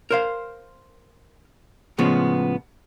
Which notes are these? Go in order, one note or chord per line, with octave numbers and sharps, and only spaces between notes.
A#4 C5 F5
A2 C#3 F3 G#3 B3